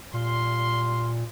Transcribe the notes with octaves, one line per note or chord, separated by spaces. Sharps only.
A#2 G3 F5 C6